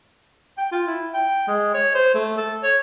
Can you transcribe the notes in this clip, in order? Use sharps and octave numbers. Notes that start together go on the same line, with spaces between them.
G5
F4
E4
G5
G#3
C#5
C5
A3
A4
C#5